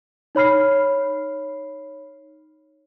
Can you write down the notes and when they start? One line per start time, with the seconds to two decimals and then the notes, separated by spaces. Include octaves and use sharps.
0.35 D#4 C#5 B5 F6 C7